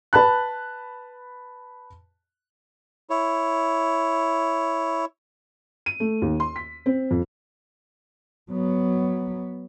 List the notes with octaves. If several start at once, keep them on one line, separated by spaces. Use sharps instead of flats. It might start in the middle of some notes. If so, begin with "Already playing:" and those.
B4 A5 B5 F#6
E4 C#5
D#7
A3
D#2
C6
B6
C4
F2
F#3 B3